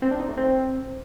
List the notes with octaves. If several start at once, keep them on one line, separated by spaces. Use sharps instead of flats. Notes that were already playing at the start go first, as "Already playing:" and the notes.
C4
D4
D#4
A3
C4